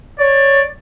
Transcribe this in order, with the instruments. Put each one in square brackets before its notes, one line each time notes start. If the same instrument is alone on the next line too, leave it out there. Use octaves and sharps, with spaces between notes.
[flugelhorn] C#5 [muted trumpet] D5